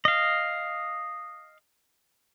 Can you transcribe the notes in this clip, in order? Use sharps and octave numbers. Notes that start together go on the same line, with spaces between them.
D#5 F5